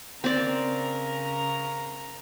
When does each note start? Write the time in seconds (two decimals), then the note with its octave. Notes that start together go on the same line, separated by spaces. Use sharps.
0.24 C#3 C4 A#4 D5 A#5